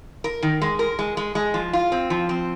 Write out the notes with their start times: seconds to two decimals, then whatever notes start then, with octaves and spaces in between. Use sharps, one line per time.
0.24 A#4
0.42 D#3
0.61 G#3
0.79 A#4
0.99 G#3
1.17 G#3
1.35 G#3
1.54 F3
1.73 F4
1.92 C4
2.10 F3
2.29 C4